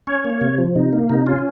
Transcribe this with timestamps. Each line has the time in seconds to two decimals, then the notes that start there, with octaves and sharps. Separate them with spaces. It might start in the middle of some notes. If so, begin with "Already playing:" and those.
0.07 C#4 C#5
0.25 A#3
0.41 C3
0.58 F3
0.75 C3 D#4
0.93 A#3
1.09 C3 D#4
1.26 C#4 F4